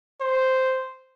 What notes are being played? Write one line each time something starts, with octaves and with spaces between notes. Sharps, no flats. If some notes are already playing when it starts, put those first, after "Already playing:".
C5